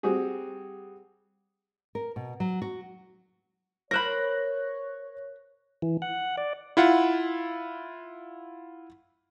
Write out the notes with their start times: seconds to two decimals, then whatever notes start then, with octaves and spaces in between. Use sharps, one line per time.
0.03 G3 C4 F#4 G#4
1.95 A#4
2.16 B2
2.40 F#3
2.62 F#4
3.91 A#4 C5 C#5 B5 F#6 A#6
5.82 E3
6.02 F#5
6.37 D5
6.77 E4 F4 F#5